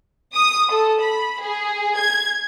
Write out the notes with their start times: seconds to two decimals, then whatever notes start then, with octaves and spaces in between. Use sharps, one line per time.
0.36 D#6
0.72 A4
1.02 B5
1.42 G#4
1.99 G#6